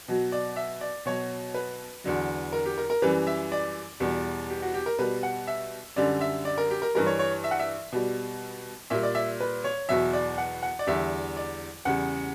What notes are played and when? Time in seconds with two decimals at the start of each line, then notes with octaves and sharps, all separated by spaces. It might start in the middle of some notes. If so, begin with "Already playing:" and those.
0.08 B2 F#3
0.32 D5
0.56 E5
0.81 D5
1.06 B2 F#3 C#5
1.54 B4
2.04 E2 D3 F#3
2.53 A#4
2.66 G4
2.77 A#4
2.90 A#4
3.02 F#2 E3 G3 B4
3.27 E5
3.52 D5
4.00 E2 B2 G3
4.50 G4
4.62 F#4
4.74 G4
4.86 A#4
4.99 B2 G3 B4
5.23 F#5
5.47 E5
5.96 F#2 D3 G3 D5
6.21 E5
6.45 D5
6.58 A#4
6.71 G4
6.82 A#4
6.95 G2 E3 G3 A#4
7.06 C#5
7.19 C#5
7.44 E5
7.51 F#5
7.59 E5
7.92 B2 G3
8.90 A#2 G3 E5
9.03 D5
9.15 E5
9.40 B4
9.64 C#5
9.89 E2 B2 F#3 E5
10.13 D5
10.38 F#5
10.63 F#5
10.79 D5
10.87 E2 D3 G3 E5
11.37 D5
11.85 E2 C#3 G3 F#5